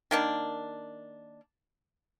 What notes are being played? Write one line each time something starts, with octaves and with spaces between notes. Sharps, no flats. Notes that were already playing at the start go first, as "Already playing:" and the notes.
D#3 A#3 D4